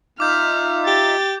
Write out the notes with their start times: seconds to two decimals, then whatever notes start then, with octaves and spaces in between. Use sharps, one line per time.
0.20 D#4 F4 E5 D6 F6 G6
0.87 G4 A6